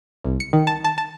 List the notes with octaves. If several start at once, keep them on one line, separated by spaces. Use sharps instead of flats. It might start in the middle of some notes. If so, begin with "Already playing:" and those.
C2
C#7
D#3
A5
A5
A5